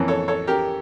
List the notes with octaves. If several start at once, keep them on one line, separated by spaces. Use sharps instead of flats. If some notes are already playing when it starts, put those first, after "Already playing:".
Already playing: F2 E3 A#3 C#4
A4 C#5
A4 C#5
G4 A#4